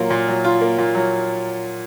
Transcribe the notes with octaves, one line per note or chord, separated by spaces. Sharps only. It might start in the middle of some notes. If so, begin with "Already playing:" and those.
Already playing: A#2 F#3 A#3 F4
A#2
F#3
F4
A#3
A#2
F#3